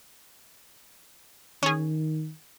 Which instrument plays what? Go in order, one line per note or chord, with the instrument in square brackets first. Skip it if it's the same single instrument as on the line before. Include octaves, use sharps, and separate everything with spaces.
[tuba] D#3 [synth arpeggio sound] C#4 G#4